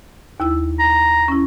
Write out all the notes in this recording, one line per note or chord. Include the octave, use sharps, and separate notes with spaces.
D#2 E4 E6
A#5
C#4 E4